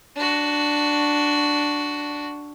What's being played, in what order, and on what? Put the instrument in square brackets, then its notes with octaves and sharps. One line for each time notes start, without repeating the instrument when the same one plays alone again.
[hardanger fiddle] D4 F#4